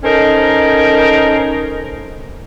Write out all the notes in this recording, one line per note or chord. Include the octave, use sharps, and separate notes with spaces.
C#4 D#4 A4 A#4 C5